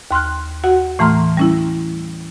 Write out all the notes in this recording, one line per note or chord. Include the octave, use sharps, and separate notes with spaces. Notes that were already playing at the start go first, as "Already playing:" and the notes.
D#2 C6 F6 F#6
F#4 F#5
A2 E3 A3 A#5 C6 F6
G3 C#4 E4